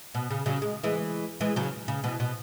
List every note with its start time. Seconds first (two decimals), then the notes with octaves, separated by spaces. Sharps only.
0.15 B2
0.31 C#3
0.46 C#3 F#3
0.62 G#3
0.83 E3 G#3
1.41 E3 G#3
1.56 C#3 F#3
1.88 C#3
2.04 B2 E3
2.20 B2